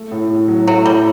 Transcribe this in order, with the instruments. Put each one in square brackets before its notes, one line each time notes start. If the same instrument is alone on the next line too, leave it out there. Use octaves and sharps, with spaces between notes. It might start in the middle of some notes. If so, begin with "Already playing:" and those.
Already playing: [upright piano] A3
A2
A2
F#3
[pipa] F#3 [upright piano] A3
[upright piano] A2 [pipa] G3